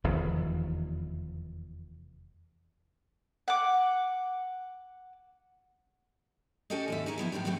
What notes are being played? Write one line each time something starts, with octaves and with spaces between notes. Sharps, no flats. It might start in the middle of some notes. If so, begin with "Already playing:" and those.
F1 E2 D#3
F#5 D6
C#4 F#4 G4 A4 D5 D#5
D#2 G#2 E5
D#4 G#4 A#4 C#5
F3 G#3 B3 E4
F#2 A2 C4 G4 D5
E2 F#3 G3 A3 C4 F#5